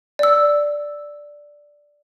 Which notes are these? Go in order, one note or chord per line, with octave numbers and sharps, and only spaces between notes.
D5 E6